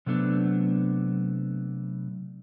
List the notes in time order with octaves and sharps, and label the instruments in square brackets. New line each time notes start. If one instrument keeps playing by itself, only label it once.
[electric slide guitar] C3 F#3 A3 B3 D4